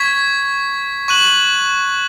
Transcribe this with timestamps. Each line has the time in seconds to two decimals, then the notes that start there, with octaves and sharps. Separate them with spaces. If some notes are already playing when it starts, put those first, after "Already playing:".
Already playing: C#6 G#6 B6
1.08 C#6 F#6 D#7 F#7